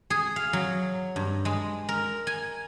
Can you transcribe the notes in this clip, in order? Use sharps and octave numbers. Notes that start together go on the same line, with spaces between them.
G#4
F5
F#3
G2
G#3
A#4
G#5